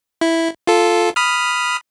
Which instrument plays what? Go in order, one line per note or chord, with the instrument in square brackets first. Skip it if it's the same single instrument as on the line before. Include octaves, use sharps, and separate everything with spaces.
[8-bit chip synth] E4
F4 A4
B5 D#6 F6